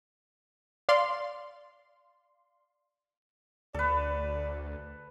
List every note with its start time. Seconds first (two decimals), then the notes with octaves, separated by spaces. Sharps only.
0.89 D5 F5 C6
3.74 D2 A4 B4 D5